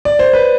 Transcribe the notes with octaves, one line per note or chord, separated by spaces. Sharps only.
D5
C5
B4